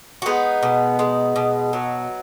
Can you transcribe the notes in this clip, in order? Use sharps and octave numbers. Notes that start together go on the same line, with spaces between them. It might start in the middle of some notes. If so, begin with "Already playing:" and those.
F#4
G#3 B3 D#4
B2
G#3
B2
F#3